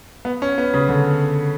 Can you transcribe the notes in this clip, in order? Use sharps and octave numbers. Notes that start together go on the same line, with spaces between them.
B3
C#4
B3
C#3
D3